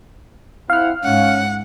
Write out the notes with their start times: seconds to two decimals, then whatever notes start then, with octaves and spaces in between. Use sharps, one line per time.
0.70 C4 E4 F5 F#5 F6
1.04 G#2 C#4 F#5